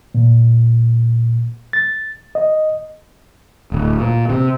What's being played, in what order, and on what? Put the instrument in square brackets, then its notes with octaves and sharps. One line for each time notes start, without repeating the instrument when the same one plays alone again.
[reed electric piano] A#2
A6
D#5
[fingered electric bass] D1
A#2
C3